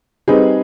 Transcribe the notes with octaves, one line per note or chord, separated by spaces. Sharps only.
G3 C4 D#4 G#4 B4